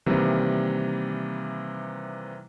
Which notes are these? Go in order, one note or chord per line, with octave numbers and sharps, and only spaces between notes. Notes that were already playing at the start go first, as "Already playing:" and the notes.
C3 D#3 E3 G3 A#3